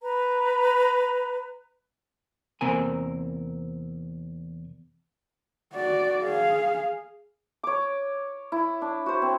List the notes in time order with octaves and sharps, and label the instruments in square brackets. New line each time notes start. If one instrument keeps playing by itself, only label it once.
[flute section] B4 A#5
[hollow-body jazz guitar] E2 C3 A#3 C4 A#4 G#5
[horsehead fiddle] F#4 D5
G#4 F5
[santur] C#5 D6
E4
D4
F#4 C5
C4